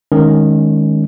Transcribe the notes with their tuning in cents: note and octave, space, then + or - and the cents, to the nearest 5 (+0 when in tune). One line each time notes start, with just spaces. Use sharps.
D#3 -5 G#3 +0 C#4 +0